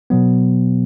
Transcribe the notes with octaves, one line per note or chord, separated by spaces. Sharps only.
B2 F#3 B3